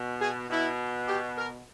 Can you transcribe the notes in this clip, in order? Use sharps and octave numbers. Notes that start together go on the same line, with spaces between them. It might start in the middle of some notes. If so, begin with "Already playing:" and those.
Already playing: B2
G#4
B2 E4
G4
A#4